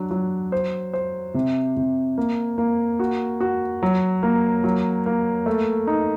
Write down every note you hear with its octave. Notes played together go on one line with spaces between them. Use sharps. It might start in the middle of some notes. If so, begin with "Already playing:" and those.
Already playing: F#3 D4
F#3
C5
C5
C3
C3
A#3
A#3
F#4
F#4
F#3
A#3
F#3
A#3
A3
D#4